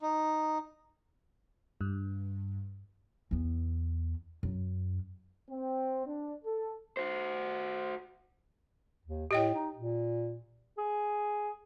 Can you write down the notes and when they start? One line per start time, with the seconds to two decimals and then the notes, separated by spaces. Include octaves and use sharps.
0.01 D#4
1.81 G2
3.31 E2 B3
4.43 F#2
5.50 C4
6.07 D4
6.44 A4
6.97 F#4 C5
9.06 D#2
9.31 A2 G4 D#5 G5
9.55 D#4
9.77 A#2
10.78 G#4